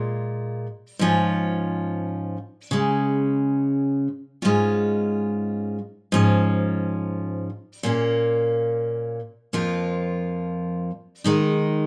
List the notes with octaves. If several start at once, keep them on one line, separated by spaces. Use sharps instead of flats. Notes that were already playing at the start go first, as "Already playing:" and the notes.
Already playing: A#2 G#3 F4
G#2 F3 C#4 F4
C#3 G#3 C#4
G#2 G#3 C#4 F4
G#2 F3 C#4
A#2 A#3 C#4
F2 F3 A#3 F4
D#3 G#3 D#4